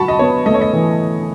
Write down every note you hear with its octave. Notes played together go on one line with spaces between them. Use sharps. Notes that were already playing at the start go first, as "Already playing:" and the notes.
Already playing: F#3 F#4 A5 B5 C#6
D#5
B3 C#5
A3 D#5
C#5
D#5
E3